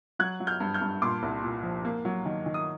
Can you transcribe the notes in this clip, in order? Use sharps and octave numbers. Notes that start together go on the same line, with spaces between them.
F#3 F#6 G#6
F#3
F6 G6
G2
F6 G6
G2
A#2 C6 D6
C2
A#2
F3
A#3
F#3
D#3
D#3
D#6